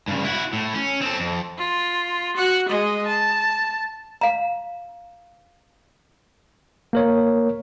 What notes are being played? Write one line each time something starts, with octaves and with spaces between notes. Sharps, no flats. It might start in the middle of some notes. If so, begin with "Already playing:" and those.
G2 C#3
E4 F#4
A2
C#4
C4 A4
F2
F4
F#4 F#5
G#3 D#5
A5
F5 A#5
A#3 A#4 C#5